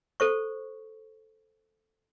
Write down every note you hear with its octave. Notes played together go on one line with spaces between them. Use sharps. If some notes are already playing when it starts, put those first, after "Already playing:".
A4 C5 C#6